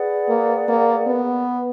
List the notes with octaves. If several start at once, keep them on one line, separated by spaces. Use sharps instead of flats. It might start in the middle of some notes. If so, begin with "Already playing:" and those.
Already playing: G#4 B4 D5 F#5
A#3
A#3
B3